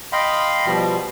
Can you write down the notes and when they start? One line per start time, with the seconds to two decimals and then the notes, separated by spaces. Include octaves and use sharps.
0.12 D#5 F5 G5 B5 C6
0.66 B2 F3 G3